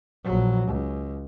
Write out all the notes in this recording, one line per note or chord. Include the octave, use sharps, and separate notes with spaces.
A#1 F#3
C#2